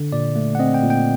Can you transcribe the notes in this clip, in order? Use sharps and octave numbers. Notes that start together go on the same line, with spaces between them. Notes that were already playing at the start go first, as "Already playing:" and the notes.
Already playing: D3
A#2 D5
A3
F#5
C4 D#5
G5
A#2
G5